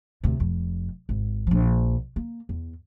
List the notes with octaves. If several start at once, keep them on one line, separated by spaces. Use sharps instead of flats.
D2 C3
F1 F2
G#1
A#1 F3
A#3
E2